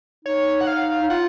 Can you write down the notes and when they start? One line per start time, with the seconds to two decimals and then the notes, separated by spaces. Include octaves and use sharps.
0.25 D#4 C#5
0.61 F#5
0.67 F5
1.02 D#4
1.10 F4 F#5